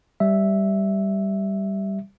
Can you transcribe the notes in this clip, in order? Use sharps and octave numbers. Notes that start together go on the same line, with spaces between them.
G3 E5